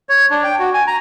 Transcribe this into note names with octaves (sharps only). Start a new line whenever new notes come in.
C#5
D4
G5
F#4
G#5
A#5